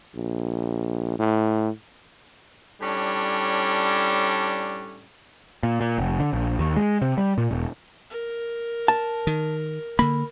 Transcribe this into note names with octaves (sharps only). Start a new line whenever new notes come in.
A#1
A2
A2 G3 C#4 D4
A#2
A#2
F1
D3
A#1
D#2
G#3
C3
G3
A#2
E1
A#4
A5
D#3
D3 A#3 B5